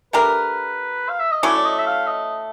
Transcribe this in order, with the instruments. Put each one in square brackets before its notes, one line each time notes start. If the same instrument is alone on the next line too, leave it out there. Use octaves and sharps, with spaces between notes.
[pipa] A3 D4 G4 A#4 [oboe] B4
[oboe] F5
E5
D#5
[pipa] F#3 A3 C#4 E4 [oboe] D5
[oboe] D5
D#5
E5
F5
D#5